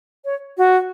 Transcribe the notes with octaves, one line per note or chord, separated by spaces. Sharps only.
C#5
F#4